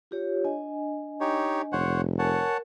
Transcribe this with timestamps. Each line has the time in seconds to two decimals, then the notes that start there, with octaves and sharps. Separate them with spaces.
0.11 F4 G4 C#5
0.45 D4 D#5 G#5
1.21 D#4 G4 C#5
1.73 F1 C5 C#5 F#5
2.19 A#4 C#5 F#5 G#5 A5